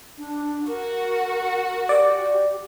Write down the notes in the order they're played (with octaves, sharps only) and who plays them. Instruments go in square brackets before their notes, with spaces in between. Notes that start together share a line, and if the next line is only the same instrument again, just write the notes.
[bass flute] D4
[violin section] F#4 [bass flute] A#4
[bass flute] G4 [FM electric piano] D5